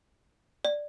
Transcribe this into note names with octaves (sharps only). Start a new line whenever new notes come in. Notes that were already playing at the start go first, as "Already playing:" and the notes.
D5